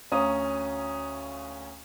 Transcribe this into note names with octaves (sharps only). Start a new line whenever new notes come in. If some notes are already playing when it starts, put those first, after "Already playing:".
D2 C#4 F5 A#5 D#6